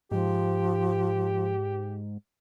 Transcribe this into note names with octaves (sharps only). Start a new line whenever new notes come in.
G#2 F3 G4